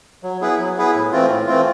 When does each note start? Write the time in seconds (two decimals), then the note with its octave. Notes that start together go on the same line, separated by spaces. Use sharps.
0.23 F#3
0.41 B3 E4 G#4 B4
0.59 F#3
0.77 B3 E4 G#4 B4
0.95 A2
1.12 E3 A3 C4 F4
1.29 A2
1.47 E3 A3 C4 F4